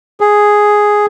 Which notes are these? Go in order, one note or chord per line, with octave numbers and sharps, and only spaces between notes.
G#4